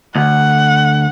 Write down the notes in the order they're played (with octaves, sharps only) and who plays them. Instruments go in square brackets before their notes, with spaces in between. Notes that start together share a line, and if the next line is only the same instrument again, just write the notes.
[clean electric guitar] D2 [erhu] F#5